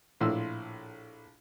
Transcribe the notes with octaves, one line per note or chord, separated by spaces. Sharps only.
A#1 A2 E4 C6 E6